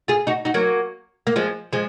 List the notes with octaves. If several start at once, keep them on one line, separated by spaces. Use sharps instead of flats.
F4 G#4
D#4 F#4
D#4 F#4
F#3 A#3
A#3
F3 G#3
F3 G#3